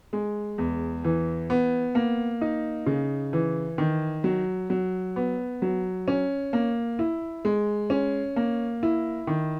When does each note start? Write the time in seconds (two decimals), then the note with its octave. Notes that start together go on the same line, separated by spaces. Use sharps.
0.13 G#3
0.58 E2
1.04 E3
1.50 B3
1.95 A#3
2.41 D#4
2.86 C#3
3.33 E3
3.78 D#3
4.24 F#3
4.70 F#3
5.16 B3
5.62 F#3
6.08 C#4
6.53 A#3
6.99 E4
7.45 G#3
7.90 C#4
8.36 A#3
8.83 E4
9.27 D#3